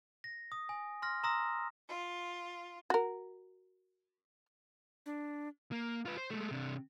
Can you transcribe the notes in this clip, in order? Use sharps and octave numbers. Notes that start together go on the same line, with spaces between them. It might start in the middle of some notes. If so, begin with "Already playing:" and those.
A#6
D#6
G#5
C6 F6 A#6
A#5 C6 D#6 E6 A#6
F4
F#4 A#4
D4
A#3
F4 B4
C5
G#3 A3
C3 D4